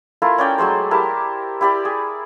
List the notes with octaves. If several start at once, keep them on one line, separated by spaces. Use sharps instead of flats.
A3 E4 F4 A#4
C#4 C#5 D5 G5
F#3 G#3 A3 C5
E4 G4 A#4 A5
E4 G4 D5
G#4